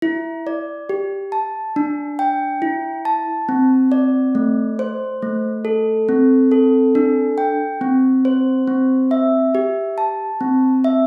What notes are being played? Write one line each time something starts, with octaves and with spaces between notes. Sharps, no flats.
E4
D5
G4
A5
D4
G5
E4
A5
C4
D5
A3
C5
A3
A4
C4
A4
D4
G5
C4
C5
C4
E5
G4
A5
C4
E5